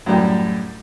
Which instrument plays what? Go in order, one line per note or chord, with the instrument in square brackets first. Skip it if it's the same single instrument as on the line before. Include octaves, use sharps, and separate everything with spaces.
[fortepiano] F#2 A2 G3